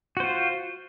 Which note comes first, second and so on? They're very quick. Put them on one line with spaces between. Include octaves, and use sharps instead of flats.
F#4 C5 F4